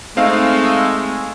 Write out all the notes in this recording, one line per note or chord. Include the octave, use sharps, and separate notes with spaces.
G#3 A3 C4 D#4 F5